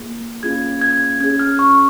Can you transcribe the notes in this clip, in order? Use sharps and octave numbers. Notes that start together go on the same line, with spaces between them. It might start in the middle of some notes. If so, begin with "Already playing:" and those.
Already playing: A#3 F4 G#4
A#3 C#4 F4 G#4 G#6
G#6
C#4 G#4 G#6
F6
C#6